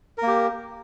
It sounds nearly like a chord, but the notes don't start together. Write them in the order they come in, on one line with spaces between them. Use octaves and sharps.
A#4 A#3 G4